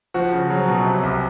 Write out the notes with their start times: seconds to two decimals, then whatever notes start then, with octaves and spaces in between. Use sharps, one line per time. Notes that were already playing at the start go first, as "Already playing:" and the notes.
0.14 F3 F#4
0.32 C#3
0.50 F#3
0.68 B2
0.85 C3
1.03 C2